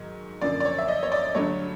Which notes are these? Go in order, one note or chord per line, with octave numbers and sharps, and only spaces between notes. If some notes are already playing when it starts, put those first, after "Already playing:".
Already playing: G#2 D#3 F#3
F#2 D3 F3 A#3 D5
D5
C#5
E5
D#5
C#5
D5
G2 D3 F#3 A3 C#5